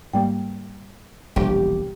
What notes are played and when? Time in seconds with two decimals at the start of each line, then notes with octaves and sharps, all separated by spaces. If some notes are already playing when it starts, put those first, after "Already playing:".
0.13 G#2 G3 A#3 G5
1.36 E1 A#1 D3 G3 G4